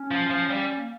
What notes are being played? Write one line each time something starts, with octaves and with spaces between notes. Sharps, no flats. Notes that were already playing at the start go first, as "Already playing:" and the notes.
Already playing: C#4
F3
F3
G3
A#3